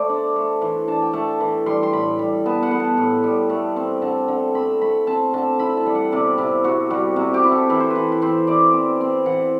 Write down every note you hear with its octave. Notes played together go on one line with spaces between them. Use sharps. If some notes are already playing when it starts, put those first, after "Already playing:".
Already playing: A3 C5 D5
D4
A3
E3
D4 A5
G5
A3 A5
E3
G3 C6
C6
A2 B5
G3
B3 A5
F#5
B3
A5
A2
G3
A3
C4
D3 A5
D3
C4 B5
A3 B5
C4 A5
D3 A5
E4 B5
A5
G3
F#5
C3 D5
C3 E4
C3 F#4
G3 F#4
C3 F#4
G4
E4
A4
E3 B4
C5
B4
E3
B4
C4 C5
E3 D5
C4
C4
E3 F#5